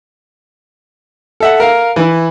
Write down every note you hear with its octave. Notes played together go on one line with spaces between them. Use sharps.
A4 E5 F#5
A#4 F5
E3 E4